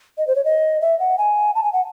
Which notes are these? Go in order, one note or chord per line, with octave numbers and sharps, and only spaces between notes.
D#5
C5
C#5
D#5
E5
F#5
G#5
A5
G#5
F#5